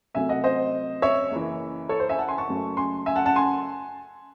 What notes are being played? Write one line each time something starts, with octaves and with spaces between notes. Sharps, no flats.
C2 C3 F#3 A3 E5 G#5
D#5 F#5
C5 D#5
C#5 E5
F#1 F#2 E3
A4 C#5
C5
E5 G#5
F#5 A5
G#5 C6
A5 C#6
F#1 F#2 C#3 F#3 A3
G#5 C6
E5 G#5
F#5 A5
F#5 A5
G#5 C6